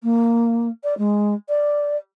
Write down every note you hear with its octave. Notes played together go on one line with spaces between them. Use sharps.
A#3
D5
G#3
D5